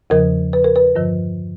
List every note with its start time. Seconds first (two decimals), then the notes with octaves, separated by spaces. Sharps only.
0.10 E2 C#3 F3 A#4
0.53 B4
0.64 A#4
0.76 B4
0.95 G2 D3 F3